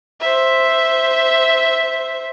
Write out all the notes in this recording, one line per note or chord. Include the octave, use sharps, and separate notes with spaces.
C5 E5